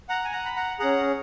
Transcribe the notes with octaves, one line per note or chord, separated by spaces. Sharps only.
F#5 A#5
G#5
F#5 A#5
B5
F#5 A#5
C#4 G#4 F#5 A#5